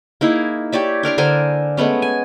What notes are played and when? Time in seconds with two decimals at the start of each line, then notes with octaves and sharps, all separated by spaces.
0.21 A#3 D#4 E4 G#4
0.72 G4 C#5 D5 E5
1.03 D4 A#4 D5 C6
1.18 D3 A#4 C5 G#5
1.77 G#3 A3 B3 C#4
2.02 G#5